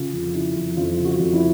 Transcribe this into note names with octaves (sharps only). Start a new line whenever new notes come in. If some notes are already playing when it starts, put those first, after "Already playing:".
Already playing: C#3 F4
F2
C#3 E4
F2
F2 F4
C#3
F#4
F2
E4